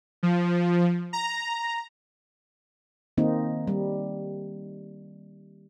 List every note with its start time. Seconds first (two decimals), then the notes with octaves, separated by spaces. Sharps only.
0.23 F3
1.13 A#5
3.17 D#3 A#3 C4 D#4
3.67 G3